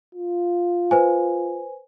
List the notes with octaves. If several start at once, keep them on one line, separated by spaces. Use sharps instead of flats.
F4
B4 C5 G#5